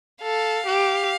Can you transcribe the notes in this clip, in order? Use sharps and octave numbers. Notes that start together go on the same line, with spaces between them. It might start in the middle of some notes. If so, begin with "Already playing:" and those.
A4 F5
G4